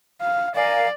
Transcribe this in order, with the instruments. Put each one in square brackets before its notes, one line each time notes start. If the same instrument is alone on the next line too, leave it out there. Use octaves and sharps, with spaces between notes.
[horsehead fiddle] F5
[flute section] A#4 F5 G#5 [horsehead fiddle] D5